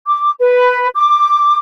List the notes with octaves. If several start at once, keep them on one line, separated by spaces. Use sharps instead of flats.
D6
B4
D6